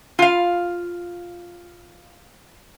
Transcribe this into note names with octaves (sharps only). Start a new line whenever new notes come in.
F4 F5